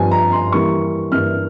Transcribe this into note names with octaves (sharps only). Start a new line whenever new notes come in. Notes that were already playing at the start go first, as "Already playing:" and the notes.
Already playing: G2 F3 C4 F4 G#5
A#5
C6
E3 G3 A#3 C#6
G2 E3 A#3 E4 F6